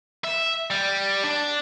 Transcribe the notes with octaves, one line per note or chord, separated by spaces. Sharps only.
E5
G3
D4